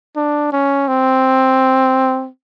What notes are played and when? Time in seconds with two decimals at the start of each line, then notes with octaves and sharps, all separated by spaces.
0.16 D4
0.53 C#4
0.88 C4